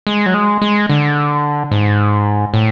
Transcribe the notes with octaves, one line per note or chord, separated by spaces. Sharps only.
G#3
F#3
G#3
G#3
D3
G#2
A2